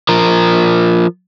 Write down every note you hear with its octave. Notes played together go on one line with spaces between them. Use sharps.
F3 A#4